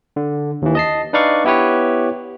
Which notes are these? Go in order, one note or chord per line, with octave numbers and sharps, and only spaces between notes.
D3
D#2 E3
D#5 A5 C7
D4 D#4 B4 D5 F5 C#6
B3 E4 G4 B4 C#5